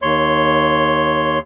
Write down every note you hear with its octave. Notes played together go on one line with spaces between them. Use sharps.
D#2 C#5 C6